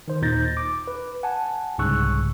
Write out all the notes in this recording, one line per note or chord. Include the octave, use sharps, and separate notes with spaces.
D#3 C5
D#2 A#2 D#4 G6 A6 A#6
D6
B4
F#5 G#5 A5
C2 G#2 C#3 C#6 E6 F#6